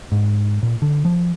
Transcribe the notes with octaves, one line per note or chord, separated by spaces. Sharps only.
G#2
A#2
D3
F3